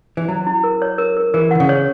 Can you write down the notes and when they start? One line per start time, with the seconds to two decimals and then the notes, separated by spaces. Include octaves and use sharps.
0.17 E3
0.28 F#3 E4
0.47 E4
0.64 A#4
0.82 C#5
0.98 A#4
1.17 A#4
1.34 E3 A#4
1.51 D#3 F#5
1.60 C#3
1.69 C#5